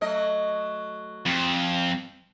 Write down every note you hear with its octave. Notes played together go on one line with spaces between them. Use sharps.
F#3 A3 D#5
F2